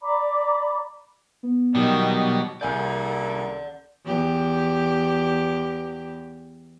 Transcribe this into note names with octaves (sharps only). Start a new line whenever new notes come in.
D5 A#5 B5 D6
B3
B2 D#3 F#3 G3
C2 A#3 G#4 A4 D5 F#5 G#5 G6
E2 G4